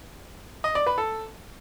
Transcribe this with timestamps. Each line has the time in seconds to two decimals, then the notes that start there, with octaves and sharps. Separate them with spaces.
0.64 D#5
0.75 D5
0.87 B4
0.98 A4